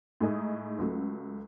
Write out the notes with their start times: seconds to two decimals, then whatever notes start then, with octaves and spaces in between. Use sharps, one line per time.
0.21 A2 G#3 D#4 G#4 D#5
0.79 C#2 C#3 F#3 A3